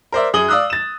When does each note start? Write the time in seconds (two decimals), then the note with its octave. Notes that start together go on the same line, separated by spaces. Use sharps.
0.12 A#4 C5 D5 E5
0.34 F#2 G#4 D#6 F#7 G7
0.49 D5 F5 D#6 E6 F#6
0.70 A6 E7